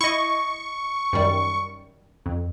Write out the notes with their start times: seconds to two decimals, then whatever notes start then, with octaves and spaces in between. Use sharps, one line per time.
0.01 E4 D#5 C#6
1.13 F#2 D#3 G3
2.26 F2